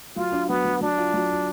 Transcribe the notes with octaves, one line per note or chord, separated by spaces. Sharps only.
F#3 F4
D4
F#3 B3
F#3
F#3 D4
F4
F#3
F4